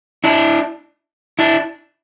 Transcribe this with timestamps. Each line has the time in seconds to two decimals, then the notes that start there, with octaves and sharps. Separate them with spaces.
0.24 D4 E4
1.39 D4 E4